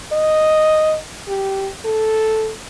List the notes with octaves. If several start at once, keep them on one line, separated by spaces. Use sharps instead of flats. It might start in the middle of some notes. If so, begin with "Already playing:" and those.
D#5
G4
A4